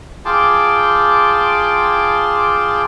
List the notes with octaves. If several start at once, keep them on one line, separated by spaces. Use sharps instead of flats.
F4 G#4 G5 A5 C6 D6